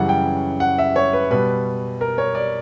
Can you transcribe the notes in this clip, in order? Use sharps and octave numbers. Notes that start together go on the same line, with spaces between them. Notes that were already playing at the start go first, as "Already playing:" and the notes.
Already playing: F#2 C#3 E3 G3 F#5
G5
F#5
E5
C#5
B4
B2 G3 B4
A#4
C#5
D5